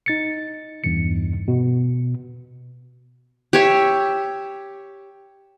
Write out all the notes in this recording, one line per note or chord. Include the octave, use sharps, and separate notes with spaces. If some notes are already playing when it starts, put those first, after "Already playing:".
D#4 A6 C#7
E2 G2 E3 C#7
B2
G4 C#5 E5